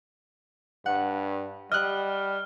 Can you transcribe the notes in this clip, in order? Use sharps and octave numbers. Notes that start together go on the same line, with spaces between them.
G2 F#5
G3 D#5 F6 F#6